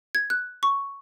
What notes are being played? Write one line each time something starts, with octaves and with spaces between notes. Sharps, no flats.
G#6
F#6
C#6